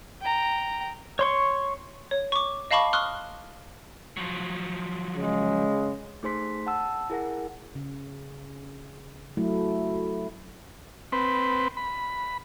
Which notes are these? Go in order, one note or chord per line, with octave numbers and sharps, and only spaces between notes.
G5 A#5
C#5 C6 C#6
C#5
C#6 D6
D#5 F5 A5 B5 C#6 D6
C6 C#6 D#6 F6 F#6
F3 F#3
C#3 G#3
A3 D#4 G#4 C5 C6 B6
F#5 A5 E6
E4 G#4 A#4 F#5 A#6
C#3
F#3 A3 E4
C4 B4
B5